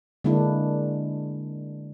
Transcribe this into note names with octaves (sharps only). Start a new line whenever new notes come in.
D3 G#3 A#3 D4 E4